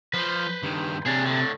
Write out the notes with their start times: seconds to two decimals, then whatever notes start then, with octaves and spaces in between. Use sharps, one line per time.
0.14 F3 B4 C5
0.63 G2 D#3
1.06 C3 D4 G#4 C#5
1.26 A2 D3